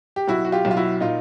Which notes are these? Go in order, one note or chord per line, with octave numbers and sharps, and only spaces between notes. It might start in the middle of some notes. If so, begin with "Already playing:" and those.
G4
B1 E4 F#4
F#4
F4 G4
B1
F4
E4 F#4
A#2 D#4 F4